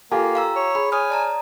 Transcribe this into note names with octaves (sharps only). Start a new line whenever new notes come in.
A#3 F4 G4 A4 G#5
F5 A#5 E6
C#5
G#4 B5
C#5 G#5 D#6 F6
D5 A5 A#5